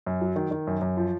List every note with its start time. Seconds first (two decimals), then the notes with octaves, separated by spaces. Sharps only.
0.06 F#2
0.21 F#3
0.36 D#3
0.51 D#3
0.67 F#2
0.81 F#2
0.97 F3